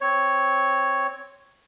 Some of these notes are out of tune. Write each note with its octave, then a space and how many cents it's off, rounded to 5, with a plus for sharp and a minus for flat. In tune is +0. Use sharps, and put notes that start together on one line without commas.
C4 +0 C#5 +0